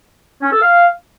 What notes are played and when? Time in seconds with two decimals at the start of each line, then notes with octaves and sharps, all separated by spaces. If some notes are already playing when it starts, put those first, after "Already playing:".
0.42 C#4
0.52 A4
0.62 F5